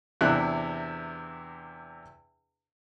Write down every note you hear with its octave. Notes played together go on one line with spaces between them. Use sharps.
E2 C3 D4 E4 F#6